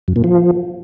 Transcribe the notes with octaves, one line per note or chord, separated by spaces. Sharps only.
F#2
A#2
F3